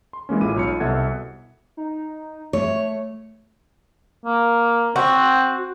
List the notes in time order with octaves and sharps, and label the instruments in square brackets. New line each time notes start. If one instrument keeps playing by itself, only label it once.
[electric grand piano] C6
E3 G#3 A#3 C#4
A1 A3 E4 F4 D6 D#7
B1 F4 C#5 B5 C#7
C2 B2 A4 E5 F#5 G#6
[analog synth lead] D#4
[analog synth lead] A3 [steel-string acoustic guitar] C#5
[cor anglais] A#3
[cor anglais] C4 [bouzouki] F#4